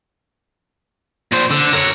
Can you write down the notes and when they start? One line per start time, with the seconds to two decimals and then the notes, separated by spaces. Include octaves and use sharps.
1.32 A#2 C5
1.51 D3
1.73 A#4 C#5